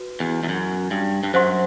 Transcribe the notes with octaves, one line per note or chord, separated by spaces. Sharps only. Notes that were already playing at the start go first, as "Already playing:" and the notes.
Already playing: F#4 B4
E2
E2
F#2
G2
G2
F#2 C5 F#5 C6